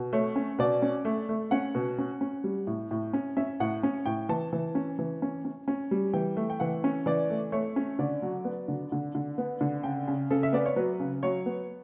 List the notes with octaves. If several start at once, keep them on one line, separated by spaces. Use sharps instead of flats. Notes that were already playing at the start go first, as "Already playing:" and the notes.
Already playing: B2
A3 C#5
C#4
B2 D5
C#4
A3
A3
C#4 F#5
B2
C#4
C#4
G3
A2
A2
C#4
C#4 E5
A2 F#5
C#4
A2 G5
E3 A5
E3
C#4
E3
C#4
C#4
C#4
G3
E3 G5
A3
G5
E3 F#5
C#4
E3 D5
A3
A3 C#5
C#4
D3 D5
F#3
B3
D3
D3
D3
B3
D3
C#3 G5
C#3
C#3 A4
E5
B3 D5
C#5
F#3 B4
C#3
F#3 C#5
B3